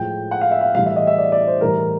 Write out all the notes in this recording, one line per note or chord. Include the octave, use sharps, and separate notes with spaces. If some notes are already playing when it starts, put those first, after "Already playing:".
Already playing: A2 F3 G#3 G5
F#5
F5
E5
F5
A2 E3 G3 F5
E5
D#5
E5
D5
D5
C5
A2 E3 G3 A#4